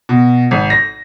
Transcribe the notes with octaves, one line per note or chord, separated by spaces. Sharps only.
B2
G#1
A#6